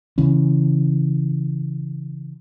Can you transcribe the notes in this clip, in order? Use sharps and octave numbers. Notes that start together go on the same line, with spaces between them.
C#3 E3 C#4